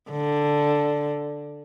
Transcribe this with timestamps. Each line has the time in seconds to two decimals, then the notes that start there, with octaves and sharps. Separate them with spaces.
0.11 D3